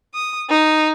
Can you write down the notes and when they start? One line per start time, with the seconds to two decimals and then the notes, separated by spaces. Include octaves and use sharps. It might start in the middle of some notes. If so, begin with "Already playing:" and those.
0.13 D#6
0.50 D#4